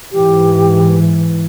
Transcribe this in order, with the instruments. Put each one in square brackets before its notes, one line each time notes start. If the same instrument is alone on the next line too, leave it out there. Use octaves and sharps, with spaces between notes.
[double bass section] G#2 E3 [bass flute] G4